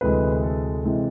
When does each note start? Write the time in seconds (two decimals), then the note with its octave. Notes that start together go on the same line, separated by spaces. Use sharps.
0.01 D2 C3 E3 G#3 B4
0.43 A4
0.85 C3 E3 G#3